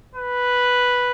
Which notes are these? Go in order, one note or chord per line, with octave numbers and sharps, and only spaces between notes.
B4